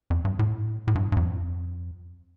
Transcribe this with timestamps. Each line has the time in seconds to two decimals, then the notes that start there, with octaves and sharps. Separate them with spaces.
0.10 F2
0.25 G2
0.39 A2
0.87 A2
0.95 G2
1.12 G2
1.17 F2